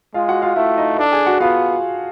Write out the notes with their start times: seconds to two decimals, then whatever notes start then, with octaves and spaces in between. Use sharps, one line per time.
0.14 G#3 F4 F5
0.28 F#4 F#5
0.42 F4 F5
0.56 A3 E4 E5
0.78 D#4 D#5
0.98 D4 A4 A5
1.12 G#4 G#5
1.26 F#4 F#5
1.40 B3 F4 F5